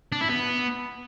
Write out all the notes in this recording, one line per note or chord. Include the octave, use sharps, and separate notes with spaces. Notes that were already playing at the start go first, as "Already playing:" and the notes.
D4
E4
B3